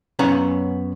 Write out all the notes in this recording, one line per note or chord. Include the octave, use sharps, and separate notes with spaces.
F#2 B3 C#4 F5 F#5 A#5